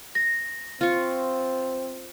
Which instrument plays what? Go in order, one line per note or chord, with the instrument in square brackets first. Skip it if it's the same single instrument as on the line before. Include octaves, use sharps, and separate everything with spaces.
[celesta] A#6
[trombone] C4 [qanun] F4 C#6